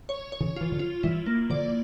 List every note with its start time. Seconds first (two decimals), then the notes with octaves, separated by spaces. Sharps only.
0.09 C#5
0.32 C#5
0.40 C#3 E3
0.56 E3 F4
0.72 D3 F3
0.79 F4
1.03 E3 G3 E4
1.26 A#3
1.50 D3 F3 D5